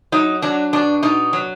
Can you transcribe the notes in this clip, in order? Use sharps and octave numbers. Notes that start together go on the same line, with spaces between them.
F#3 D#4
F#3 D4
B2 D4
B2 D#4
F#3